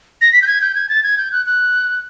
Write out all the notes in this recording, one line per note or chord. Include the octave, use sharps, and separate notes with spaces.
A#6
B6
G6
G#6
G6
G#6
A6
G#6
G6
F#6
F#6